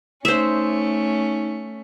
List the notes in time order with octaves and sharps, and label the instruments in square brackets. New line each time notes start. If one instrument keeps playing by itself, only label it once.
[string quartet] A3 C#4 [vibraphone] D#4 [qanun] C5 E5